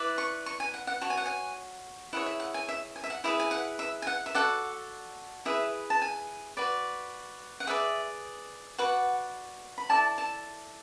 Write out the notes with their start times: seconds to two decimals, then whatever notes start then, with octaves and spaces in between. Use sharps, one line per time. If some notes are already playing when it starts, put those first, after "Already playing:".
Already playing: E4 B4 D5
0.18 C#6
0.46 C#6
0.60 G#5
0.74 F#5
0.87 F#5
1.01 F#4 C#5 A5
1.10 G#5
1.17 F#5
1.26 G#5
2.13 E4 G#4 C#5 F#5
2.26 E5
2.40 F#5
2.54 G#5
2.69 E5
2.96 G#5
3.04 E5
3.10 F#5
3.24 E4 G#4 B4 E5
3.40 G#5
3.51 F#5
3.79 E5
4.02 G#5
4.07 F#5
4.26 E5
4.34 F#4 A4 D5 F#5
5.45 E4 G#4 B4 E5
5.90 A5
6.02 G#5
6.57 F#4 B4 D5
7.60 F#5
7.67 G#4 B4 D5 E5
8.78 F#4 B4 D5 F#5
9.78 B5
9.90 E4 A4 D5 A5
10.18 A5